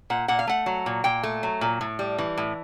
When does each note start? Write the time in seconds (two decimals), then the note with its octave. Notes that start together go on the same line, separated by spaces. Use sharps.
0.10 A#2 F#5
0.28 A#2 F#5
0.39 F5
0.47 A3 F#5
0.66 F#3
0.86 A#2
1.04 A#2 G5
1.23 A3
1.43 F#3
1.61 A#2
1.81 A2
1.99 G3
2.18 E3
2.38 A2